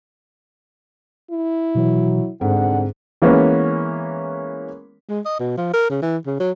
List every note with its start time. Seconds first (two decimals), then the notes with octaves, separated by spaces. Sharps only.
1.31 E4
1.75 B2 E3 F#3
2.41 G1 C2 G#2 D3 C4 F#5
3.22 E3 G#3 A#3 B3 C#4
5.09 G#3
5.25 D#5
5.40 B2
5.58 F3
5.74 A#4
5.90 C#3
6.02 E3
6.27 C#3
6.40 F#3